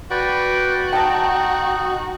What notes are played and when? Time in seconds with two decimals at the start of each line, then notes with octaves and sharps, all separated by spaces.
0.11 F#4 B4 D5 G5
0.93 D#4 G5 A5